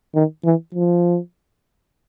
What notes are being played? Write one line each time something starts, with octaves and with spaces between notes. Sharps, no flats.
D#3
E3
F3